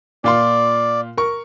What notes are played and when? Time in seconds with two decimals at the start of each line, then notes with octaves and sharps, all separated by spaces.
0.24 A#2 F4 D5 C6
1.17 A#4 C#6